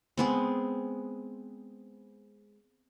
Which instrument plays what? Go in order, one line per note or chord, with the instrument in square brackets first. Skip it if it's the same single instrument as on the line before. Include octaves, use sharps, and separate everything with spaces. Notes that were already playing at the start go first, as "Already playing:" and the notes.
[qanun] G#3 B3 C4